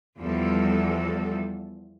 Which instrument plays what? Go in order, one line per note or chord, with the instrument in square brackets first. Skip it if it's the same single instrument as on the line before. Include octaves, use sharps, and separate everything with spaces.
[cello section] E2 F3 G3 A4